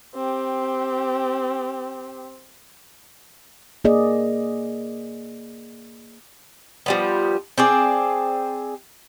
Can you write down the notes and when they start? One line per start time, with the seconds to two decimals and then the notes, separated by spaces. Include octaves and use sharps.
0.15 C4 G4
3.85 A#3 G#4 D5 D#5
6.86 F3 G3 B3
7.58 C4 G#4 D5